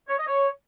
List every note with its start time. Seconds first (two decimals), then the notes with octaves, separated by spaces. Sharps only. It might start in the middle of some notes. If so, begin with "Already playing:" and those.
0.09 C#5
0.18 D#5
0.28 C#5